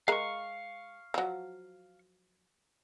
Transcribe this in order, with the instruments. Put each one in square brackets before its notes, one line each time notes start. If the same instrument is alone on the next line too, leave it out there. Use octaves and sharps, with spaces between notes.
[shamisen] G#3 A#4 [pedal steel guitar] F5 C#6
[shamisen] F3 F#3